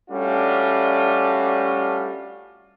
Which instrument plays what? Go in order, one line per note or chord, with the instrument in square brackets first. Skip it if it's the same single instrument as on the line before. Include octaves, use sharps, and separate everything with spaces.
[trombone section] G3 A3 C#4 D4 F4 F#4